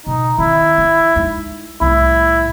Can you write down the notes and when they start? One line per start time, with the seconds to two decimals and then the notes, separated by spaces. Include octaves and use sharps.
0.07 B2 D#4
0.38 D#3 C4 E4
0.78 D4
1.16 G#3 D#4
1.81 C2 A2 E4